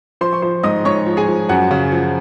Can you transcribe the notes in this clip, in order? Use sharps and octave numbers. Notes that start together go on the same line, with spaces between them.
F3 C5 C6
C#6
F3 C5 C6
G#2 D#5 D#6
G#2 C#5 C#6
F3
G#4 G#5
F3
F#2 F#4 F#5
C#3
F3